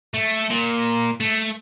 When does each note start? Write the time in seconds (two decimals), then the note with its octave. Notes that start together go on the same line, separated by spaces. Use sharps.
0.14 A3
0.50 A#2
1.21 A3